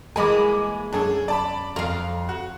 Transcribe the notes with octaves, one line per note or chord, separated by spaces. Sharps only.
E3 G#3 A#3 G#5 B5 D6
F#2 D4 G#4 A4
D5 A5 B5
F2 F5 A#5
F#4